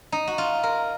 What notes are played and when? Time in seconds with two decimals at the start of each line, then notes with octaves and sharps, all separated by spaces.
0.12 D#4
0.28 F#4
0.38 F4
0.63 A#4